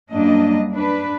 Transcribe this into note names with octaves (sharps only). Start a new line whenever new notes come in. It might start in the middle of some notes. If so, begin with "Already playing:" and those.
F#2 G3 A#3 D4 D#5
D4 B4